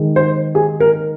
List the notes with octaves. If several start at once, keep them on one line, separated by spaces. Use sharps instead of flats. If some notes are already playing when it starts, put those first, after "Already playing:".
Already playing: D#3 G#3
C5
G#4
A#4